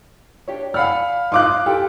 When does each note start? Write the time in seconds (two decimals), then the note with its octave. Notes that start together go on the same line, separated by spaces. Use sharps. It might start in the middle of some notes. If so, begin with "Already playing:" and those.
0.48 D4 G4 C#5
0.74 D5 F5 F#5 G#5 B5 F6
1.32 D#4 F4 F5 C6 D6 F#6
1.66 G4 A4 G5 G#5